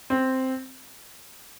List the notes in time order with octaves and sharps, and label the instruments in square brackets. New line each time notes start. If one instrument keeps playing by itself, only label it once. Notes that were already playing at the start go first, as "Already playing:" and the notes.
[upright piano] C4